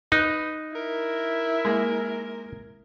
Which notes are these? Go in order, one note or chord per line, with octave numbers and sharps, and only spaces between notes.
D#4 B4 F#6
E4 A#4
G#3 A#3